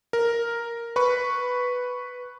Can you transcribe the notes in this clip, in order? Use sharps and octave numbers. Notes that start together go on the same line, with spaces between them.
A#4
B4 B5 C#6